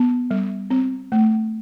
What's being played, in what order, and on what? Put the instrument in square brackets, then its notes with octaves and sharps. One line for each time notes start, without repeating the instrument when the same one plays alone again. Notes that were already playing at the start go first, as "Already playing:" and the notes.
Already playing: [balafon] B3
G3
C4
A3